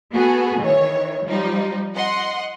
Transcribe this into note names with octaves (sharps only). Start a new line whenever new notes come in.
B3 F#4 G#4 A4
D#3 E3 C#5
F3 G3 D#4
D#5 F#5 C6